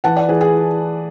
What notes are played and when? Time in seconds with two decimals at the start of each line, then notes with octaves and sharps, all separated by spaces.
0.04 E3 F#5 A5
0.16 D5 F#5
0.29 E3 G#4 B4
0.41 G#4